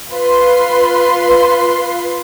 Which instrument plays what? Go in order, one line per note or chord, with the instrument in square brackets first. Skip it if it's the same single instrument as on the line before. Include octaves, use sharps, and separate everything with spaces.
[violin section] F4 B4 C6